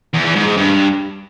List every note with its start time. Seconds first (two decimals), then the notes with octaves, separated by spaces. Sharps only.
0.14 E2
0.24 E2
0.35 G#2
0.46 G#2
0.57 G2